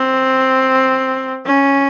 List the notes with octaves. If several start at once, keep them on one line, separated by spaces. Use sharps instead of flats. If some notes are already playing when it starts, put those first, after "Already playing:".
Already playing: C4
C#4